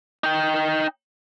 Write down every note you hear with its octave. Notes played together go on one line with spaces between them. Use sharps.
D#4 G5